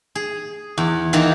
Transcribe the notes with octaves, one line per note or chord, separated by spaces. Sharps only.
G#4
E2
D#3 E3 A#3 D#4